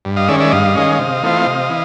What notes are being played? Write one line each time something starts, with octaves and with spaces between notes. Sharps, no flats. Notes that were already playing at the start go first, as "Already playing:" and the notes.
G2
D#5 F5
D#3 G#3 C#4 D5 E5
D5 E5
G2 D#5 F5
D#3 G#3 C#4
C3
E3 A3 C4 F4
C3
E3